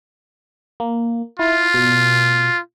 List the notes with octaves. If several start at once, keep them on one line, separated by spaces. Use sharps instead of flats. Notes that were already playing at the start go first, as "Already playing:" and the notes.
A#3
E4 F4
B2